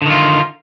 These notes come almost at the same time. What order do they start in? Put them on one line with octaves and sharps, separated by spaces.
D3 D#3 F4